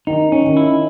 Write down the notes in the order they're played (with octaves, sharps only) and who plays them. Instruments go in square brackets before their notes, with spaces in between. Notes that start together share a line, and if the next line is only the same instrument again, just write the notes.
[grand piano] D#3 [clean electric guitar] D#4
[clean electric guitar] C#4
[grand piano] D#3
[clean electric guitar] E4